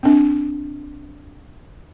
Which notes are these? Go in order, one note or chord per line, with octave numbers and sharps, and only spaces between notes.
C4 D4